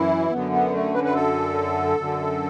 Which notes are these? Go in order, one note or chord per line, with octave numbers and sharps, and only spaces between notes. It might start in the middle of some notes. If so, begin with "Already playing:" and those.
Already playing: F#2 E3 E4
F#2 D3 B3
B3
A3
B4
B4
A4
F#2 D3